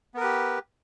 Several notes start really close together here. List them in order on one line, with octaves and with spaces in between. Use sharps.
B3 A#4 B4 G4